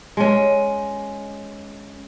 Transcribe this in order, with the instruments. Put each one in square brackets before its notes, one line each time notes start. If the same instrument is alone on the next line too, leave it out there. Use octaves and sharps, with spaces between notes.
[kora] G#3 C#4